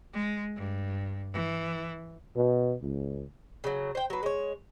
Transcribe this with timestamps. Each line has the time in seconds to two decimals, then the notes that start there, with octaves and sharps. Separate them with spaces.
0.13 G#3
0.56 G2
1.32 E3
2.36 B2
2.82 C#2
3.64 C#3 F#3
3.95 C5 G5
4.10 F#3 B4
4.23 G#3 C#5